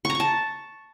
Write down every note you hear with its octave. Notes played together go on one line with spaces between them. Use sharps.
C#6
A#5
C#6
A5